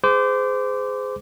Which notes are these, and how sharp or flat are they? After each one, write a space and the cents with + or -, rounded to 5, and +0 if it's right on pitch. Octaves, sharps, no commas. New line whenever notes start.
G#4 +0 C5 -30 D6 -10